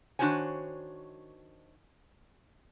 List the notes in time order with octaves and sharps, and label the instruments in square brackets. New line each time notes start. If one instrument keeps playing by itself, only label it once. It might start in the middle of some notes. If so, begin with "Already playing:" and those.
[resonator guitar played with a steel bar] D#3 D4 F#4 C5 C#5 G#5